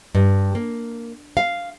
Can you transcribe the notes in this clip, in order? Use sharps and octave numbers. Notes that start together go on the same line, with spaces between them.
G2
A#3
F5